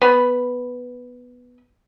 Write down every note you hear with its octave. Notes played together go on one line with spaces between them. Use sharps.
B3 B5